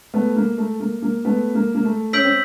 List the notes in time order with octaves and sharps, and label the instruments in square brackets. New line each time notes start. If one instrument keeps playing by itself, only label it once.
[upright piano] A3 B3
A#3
A3
A#3
A#3
A3 B3
A#3
A#3
A3
[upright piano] C#4 [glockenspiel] E6 G6 B6 D7 F#7
[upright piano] C4